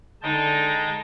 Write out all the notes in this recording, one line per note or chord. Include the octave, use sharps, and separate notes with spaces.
D3 G#3 D#4 D#5 G5 A5 A#6